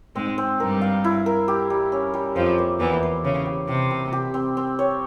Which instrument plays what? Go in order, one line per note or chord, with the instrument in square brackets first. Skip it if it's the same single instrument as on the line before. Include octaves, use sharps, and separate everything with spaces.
[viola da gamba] G#2 G#3 [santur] C4
[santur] C4
[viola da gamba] G2 G3 [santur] A#4
[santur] F5
E4
A#4
G4
G3
C#4
G3
[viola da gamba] F2 F3 [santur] C5
[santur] A#3
[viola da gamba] E2 E3 [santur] A#3
[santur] C5
[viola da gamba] C#3 [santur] C#5
[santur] G4
[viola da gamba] C3 [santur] G4
[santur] C4
G4
C4
C4
C#5